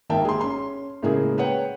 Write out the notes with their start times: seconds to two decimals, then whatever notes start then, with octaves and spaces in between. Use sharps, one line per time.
0.10 G#1 G#2 A#3 E5 G5 A5
0.25 G#4 C6
0.41 C#4 C6
1.03 A2 C#3 G#3 A#3 G#4
1.38 B4 C#5 F#5 G5